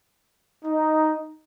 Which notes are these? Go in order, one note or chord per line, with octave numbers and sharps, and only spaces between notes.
D#4